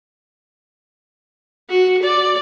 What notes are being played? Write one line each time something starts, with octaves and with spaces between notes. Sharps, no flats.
F#4
D5